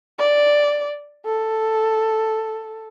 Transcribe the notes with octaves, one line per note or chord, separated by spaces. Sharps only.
D5
A4